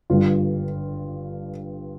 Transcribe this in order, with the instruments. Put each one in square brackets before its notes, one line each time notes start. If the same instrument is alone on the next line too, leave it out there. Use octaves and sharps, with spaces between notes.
[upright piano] G1 G2 D3 G3 F4